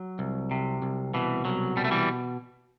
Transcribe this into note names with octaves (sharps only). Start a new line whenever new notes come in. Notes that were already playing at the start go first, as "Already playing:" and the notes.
Already playing: F#3
C2
C3
C2
B2 E3
C2 F#3
B2 G3
A3
E3 G3